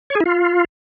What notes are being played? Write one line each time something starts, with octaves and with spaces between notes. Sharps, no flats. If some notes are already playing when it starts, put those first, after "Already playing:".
C#5
G#4
E4
F4